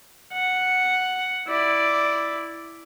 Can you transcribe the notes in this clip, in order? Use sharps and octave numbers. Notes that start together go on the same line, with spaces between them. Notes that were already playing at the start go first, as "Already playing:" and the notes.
F#5
E4 D5